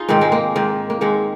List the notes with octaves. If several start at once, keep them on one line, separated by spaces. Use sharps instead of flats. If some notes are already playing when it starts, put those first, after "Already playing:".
Already playing: D#4 F4 G#4
G#2 D#3 C4
G#3
A#3
G#2 D#3
A#3
G#2 D#3 G#3